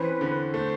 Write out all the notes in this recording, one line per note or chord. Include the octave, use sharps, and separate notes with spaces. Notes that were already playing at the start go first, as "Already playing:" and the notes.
Already playing: E3 C4 C#4 B4
D3
A3 C5